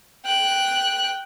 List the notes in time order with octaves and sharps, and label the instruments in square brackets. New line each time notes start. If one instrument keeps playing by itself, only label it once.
[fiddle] G5 F#6